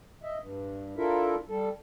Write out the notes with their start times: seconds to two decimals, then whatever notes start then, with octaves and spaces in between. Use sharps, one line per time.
0.23 D#5 E5
0.39 G2
0.97 D4 E4 F4 A4 A#4 E5
1.49 G3 A4